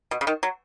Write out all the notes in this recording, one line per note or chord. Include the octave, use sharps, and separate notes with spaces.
B2
C#3
D#3
F#3